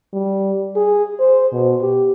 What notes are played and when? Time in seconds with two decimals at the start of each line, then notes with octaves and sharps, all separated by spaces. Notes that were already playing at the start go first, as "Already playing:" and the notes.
0.13 G3
0.76 G#4
1.19 C5
1.52 B2
1.81 G4